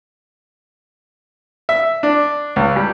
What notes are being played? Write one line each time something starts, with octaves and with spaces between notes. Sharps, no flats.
E5
D4
C#2
G3